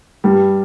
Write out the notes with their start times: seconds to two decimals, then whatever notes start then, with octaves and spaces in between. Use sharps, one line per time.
0.24 G2 G3